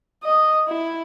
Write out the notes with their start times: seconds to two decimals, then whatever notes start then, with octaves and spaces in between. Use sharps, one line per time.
0.23 D#5
0.67 E4